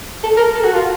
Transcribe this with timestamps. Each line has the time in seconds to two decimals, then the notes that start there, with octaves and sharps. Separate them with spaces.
0.24 A4
0.37 A#4
0.54 A4
0.64 F#4
0.74 F4